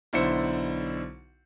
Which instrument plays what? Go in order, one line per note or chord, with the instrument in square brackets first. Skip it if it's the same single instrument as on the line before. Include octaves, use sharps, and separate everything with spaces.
[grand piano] B1 D3 E4 C5 C#7